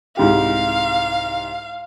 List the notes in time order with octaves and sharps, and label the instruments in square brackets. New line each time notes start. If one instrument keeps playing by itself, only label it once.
[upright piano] C2 G#2 G4 [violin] F5